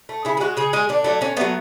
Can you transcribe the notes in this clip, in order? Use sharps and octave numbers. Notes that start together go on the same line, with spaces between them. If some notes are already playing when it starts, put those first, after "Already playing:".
A3
C#3 E4
G#4
G#3 F#4
C#3 G#4
G#3 G#4
D3 D4
F#3 A3
D3 C#4
F#3 A3 B3